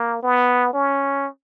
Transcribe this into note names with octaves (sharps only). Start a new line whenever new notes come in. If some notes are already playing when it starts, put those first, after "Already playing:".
Already playing: A#3
B3
C#4